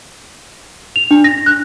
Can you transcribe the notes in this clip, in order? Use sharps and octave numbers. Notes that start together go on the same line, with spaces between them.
F7
D4
A#6
F#6